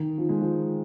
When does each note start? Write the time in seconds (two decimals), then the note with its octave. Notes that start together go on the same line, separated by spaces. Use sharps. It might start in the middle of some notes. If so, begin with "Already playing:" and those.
Already playing: D#3
0.18 F3
0.29 G#3
0.41 F3